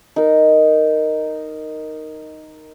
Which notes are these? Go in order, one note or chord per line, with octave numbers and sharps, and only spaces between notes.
D#4 A#4